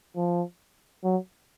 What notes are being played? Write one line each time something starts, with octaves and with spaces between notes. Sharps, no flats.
F3
F#3